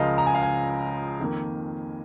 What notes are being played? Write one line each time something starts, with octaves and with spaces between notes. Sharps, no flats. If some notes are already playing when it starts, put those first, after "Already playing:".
Already playing: C#2 C#3 F3 G#3 A#4 D#5 F5
A#5
G#5
F5
G#5
F2 D#3 A#3